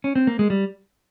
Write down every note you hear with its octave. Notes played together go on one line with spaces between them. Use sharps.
C#4
C4
A#3
G#3
G3